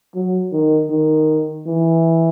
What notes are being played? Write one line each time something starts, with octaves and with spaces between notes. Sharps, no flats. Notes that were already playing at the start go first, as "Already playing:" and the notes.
F#3
D#3
D#3
E3